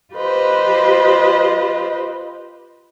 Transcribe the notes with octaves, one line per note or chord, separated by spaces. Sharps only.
F4 G4 B4 C5 D#5